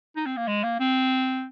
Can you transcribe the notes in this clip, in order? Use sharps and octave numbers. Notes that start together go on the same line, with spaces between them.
D#4
C4
A#3
G#3
A#3
C4